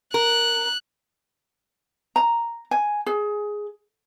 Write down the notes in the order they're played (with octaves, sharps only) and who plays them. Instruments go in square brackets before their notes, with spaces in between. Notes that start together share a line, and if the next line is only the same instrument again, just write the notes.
[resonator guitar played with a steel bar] A#4 [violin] F#6
[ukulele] A#5
G#5
G#4